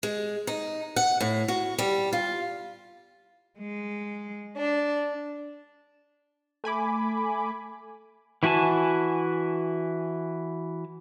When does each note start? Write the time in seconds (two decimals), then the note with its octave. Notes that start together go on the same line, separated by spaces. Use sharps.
0.03 G#3
0.47 D#4
0.96 F#5
1.21 A2
1.48 F#4
1.78 G3
2.13 F4
3.59 G#3
4.57 D4
6.64 A3 G#5 B5 D6
8.43 E3 E4 F#4 G#5 A5